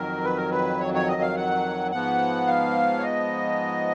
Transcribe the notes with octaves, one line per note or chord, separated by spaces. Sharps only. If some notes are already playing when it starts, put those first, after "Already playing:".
Already playing: F2 D#3 F#3 A#4
B4
A#4
B4
C#5
C#5
D#5
F5
F#5
G#2 F3 B3 F#5
F5
C#5
D#5